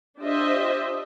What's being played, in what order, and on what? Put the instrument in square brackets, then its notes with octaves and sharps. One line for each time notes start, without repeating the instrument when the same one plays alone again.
[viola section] D4 F4 G4 C5 D#5 E5